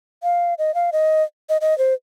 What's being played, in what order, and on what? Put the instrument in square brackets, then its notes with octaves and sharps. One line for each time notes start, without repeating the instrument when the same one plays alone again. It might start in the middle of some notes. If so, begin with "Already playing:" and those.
[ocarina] F5
D#5
F5
D#5
D#5
D#5
C5